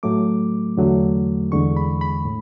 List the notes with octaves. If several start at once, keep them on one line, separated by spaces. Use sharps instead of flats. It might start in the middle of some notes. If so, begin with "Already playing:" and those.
A2 F#3 A3 D6
E2 D3 F#3 A3
E2 D3 G#3 C#6
B5
B5
A2